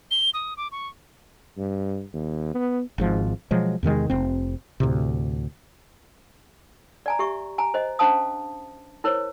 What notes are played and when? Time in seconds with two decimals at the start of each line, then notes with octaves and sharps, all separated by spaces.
0.11 G7
0.34 D#6
0.57 D6
0.72 C#6
1.58 G2
2.14 D#2
2.54 B3
2.98 G#1 G#2 F3
3.51 B2 F3 F#3 G#3
3.83 E2 C3 D#3 G#3
4.10 F1 C4
4.80 D2 A2 C3
7.06 D5 G#5 A#5
7.19 G4 E5 C#6
7.58 G#5 A#5
7.74 C5 D#5
7.99 C#4 D4 C5 F5 A5 D#6
9.04 E4 A#4 C5 C#5